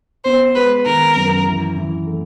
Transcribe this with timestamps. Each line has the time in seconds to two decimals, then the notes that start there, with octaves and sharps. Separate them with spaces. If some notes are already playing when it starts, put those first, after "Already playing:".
0.24 B3 C5
0.55 G#3 B4
0.86 D#3 A#4
1.16 F#2
1.46 E3
1.77 E3
2.07 A3